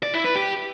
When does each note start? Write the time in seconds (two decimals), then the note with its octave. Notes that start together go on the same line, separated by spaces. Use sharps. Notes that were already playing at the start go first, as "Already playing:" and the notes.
0.03 D5
0.14 E4
0.24 B4
0.35 G4